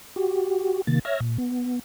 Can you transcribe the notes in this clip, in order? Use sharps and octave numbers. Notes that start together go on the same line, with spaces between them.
F#4 G4
C3 D#3 A#3 A6
C#5 E5 E6 F6 G#6 A#6
A#2
B3